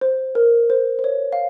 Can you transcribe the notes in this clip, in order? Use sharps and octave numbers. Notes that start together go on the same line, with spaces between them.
C5
A#4
C5
C5
C#5
F5